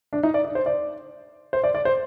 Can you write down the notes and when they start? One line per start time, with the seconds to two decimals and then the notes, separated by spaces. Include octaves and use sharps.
0.13 D4
0.23 D#4
0.34 D5
0.45 D5
0.55 C5
0.66 D5
1.53 C5
1.64 D5
1.75 D5
1.85 C5